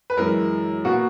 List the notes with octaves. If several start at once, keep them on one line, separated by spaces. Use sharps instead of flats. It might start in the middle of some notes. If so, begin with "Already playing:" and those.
B4
F#2 E3 G#3 A#4
B2 A#3 F#4